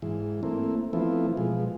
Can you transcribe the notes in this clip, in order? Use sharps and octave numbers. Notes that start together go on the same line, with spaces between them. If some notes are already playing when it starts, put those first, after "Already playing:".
G#2 E3
A3 A#3 C4 E4
E3 F3 A3 B3 C4 E4
B2 F3 G#3